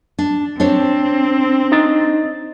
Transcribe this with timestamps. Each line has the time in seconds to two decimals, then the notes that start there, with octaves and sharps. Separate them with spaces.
0.19 D4
0.60 C4 D4 C5 C#5
1.72 D#4 D#5 A6